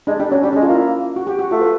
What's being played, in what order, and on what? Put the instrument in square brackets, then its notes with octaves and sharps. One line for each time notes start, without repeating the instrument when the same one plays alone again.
[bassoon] G#3 [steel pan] D4
[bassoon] G3 [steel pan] D4
[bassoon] F#3 [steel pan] C#4
[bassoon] G3 [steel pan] D4
[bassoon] G#3 [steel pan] C#4
[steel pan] F4
[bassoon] A#3 [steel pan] E4
[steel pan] F#4
G4
F#4
[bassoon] A3 [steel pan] F4
[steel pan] B4